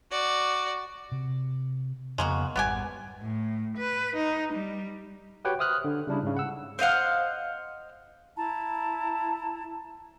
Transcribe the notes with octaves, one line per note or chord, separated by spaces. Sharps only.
F#4 D5
C3
F2 C#3 G#3 A#3 B3 F#4
G#1 G3 G#3 B3 G4 G#5
A2
B4
D#4
G3
F#4 G4 B4 C#5 F#5 G5
C5 E5 D#6 F6 F#6
D3
C#3 G3 D4 E4
G#2 C#3
F#5 E6
C5 D#5 F5 F#5
E4 A5 A#5